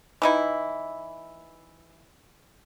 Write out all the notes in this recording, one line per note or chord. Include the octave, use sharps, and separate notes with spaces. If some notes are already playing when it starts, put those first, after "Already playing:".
E3 D#4 E4